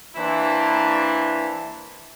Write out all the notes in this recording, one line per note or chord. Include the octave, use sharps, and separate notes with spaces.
E3 A#3 D4 E4 C5